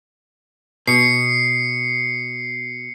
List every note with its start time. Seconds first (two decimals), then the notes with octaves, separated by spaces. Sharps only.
0.87 B2 C7 C#7